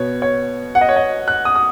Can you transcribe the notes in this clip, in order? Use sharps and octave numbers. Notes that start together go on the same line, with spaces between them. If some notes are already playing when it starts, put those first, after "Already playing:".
Already playing: B2 B3 C#5
C#5
F#5
D#5
C#5
D#5
F#6
D#6
D#6